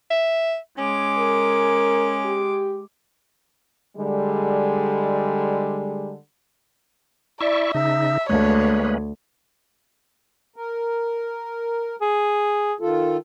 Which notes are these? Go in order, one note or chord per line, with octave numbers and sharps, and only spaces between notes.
E5
G#3 C#4 D6
A#4
G4
D3 G3 G#3
E4 D5 E5 C#6
C#3 D#4 E5
D2 G#3 A#3 B4 C#5
A#4
G#4
D#3 F4 A4